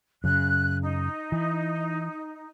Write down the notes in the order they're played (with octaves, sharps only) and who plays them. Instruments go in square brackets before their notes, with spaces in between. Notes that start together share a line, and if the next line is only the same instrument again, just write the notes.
[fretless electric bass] F#2 C#3 [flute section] F#6
[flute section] D#4
[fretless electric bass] E3